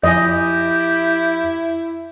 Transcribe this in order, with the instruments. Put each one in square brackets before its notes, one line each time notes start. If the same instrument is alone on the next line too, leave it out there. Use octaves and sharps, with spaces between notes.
[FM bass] F2 [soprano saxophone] E4 [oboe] G4 [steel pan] D#5 G#5